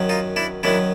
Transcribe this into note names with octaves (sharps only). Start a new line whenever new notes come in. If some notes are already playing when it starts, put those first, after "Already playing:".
Already playing: F#2 D#3 F#3
D#4 F4
D4 E4
F#2 D#3 F#3 D4 E4